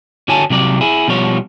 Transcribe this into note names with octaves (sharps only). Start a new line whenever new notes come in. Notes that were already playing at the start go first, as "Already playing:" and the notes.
D3 F#4 C#5 G#5 A5
C3 F#3 G3 D5
E4 G#4
B2 F3 G3 C#5